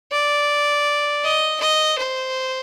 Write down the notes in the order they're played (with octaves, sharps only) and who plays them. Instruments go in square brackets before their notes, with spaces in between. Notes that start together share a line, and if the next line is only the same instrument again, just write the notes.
[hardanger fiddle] D5
D#5
D#5
C5